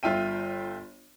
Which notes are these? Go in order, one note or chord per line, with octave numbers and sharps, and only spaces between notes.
G1 F4 E5 G5 D#7